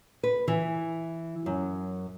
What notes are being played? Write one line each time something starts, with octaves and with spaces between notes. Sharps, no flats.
B4
E3
F#2